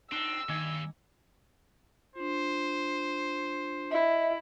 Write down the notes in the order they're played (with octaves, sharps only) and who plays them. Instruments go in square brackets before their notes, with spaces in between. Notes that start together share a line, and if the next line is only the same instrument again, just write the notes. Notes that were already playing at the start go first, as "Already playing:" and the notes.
[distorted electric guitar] C4 [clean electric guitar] D4 D#4 [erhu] E6
[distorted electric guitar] G2 [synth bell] D#3 [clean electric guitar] A#3 G#5
[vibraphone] D4 F4 [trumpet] C5
[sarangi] E4 [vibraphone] D#5 E5